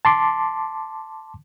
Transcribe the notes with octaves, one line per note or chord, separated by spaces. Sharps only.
A5 C6 D6